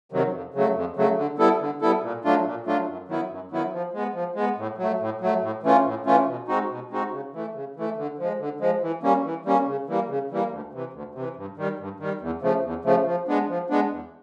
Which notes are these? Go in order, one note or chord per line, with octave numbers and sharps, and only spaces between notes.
C3 D#3 F#3
F2
C#3 F#3 A3
F2
C#3 F#3 A3
D3
G3 B3 E4 A4
D3
G3 B3 E4 A4
A#2
F#3 A3 D4 F4
A#2
F#3 A3 D4 F4
F#2
D#3 F#3 B3 E4
F#2
D#3 F#3 B3 E4
F3
G#3 B3
F3
G#3 B3
A2
F#3 A3
A2
F#3 A3
A2
E3 A3 C#4 F4
A2
E3 A3 C#4 F4
B2
G#3 C4 D#4 F#4
B2
G#3 C4 D#4 F#4
C#3
E3 A3
C#3
E3 A3
D3
F3 G#3
D3
F3 G#3
E3
G3 A#3 C#4
E3
G3 A#3 C#4
C#3
E3 G3 A#3
C#3
E3 G3 A#3
D2
C3 E3
D2
C3 E3
G2
D#3 G3
G2
D#3 G3
E2
C#3 F3 A3
E2
C#3 F3 A3
F3
G#3 B3 D4
F3
G#3 B3 D4
E2